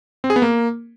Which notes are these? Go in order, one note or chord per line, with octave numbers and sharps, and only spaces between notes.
C4
G#4
B3
A#3